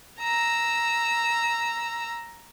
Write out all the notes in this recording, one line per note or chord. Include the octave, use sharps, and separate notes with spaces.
A#5 E6